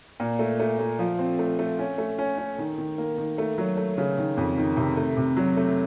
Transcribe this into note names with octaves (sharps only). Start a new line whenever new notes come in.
A#2
A3
A3
A3
F3
C4
A3
A3
C#4
A3
C#4
C#4
D#3
D#3
A#3
D#3
A3
F#3
A3
C#3
D#3
F2
D#3
C3
A3
C3
F#3
A3